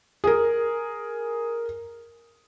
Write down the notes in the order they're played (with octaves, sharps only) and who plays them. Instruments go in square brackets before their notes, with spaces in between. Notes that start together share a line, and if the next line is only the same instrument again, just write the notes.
[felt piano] G#4 A#4